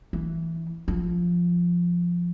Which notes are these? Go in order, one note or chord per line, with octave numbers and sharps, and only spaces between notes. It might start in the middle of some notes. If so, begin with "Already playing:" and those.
E3
F3